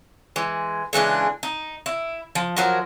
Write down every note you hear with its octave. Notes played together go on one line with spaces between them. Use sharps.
E3 G#3
C#3 E3 G#3 D4
D#4
E4
F3
F3 F#3 A#4